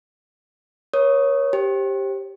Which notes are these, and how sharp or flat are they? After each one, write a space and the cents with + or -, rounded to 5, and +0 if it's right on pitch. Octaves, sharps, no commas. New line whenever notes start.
A#4 +40 C#5 +0 D#6 +0
G4 +0 C5 +35